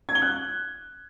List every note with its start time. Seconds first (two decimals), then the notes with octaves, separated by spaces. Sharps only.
0.09 G#6
0.15 G7
0.22 F#6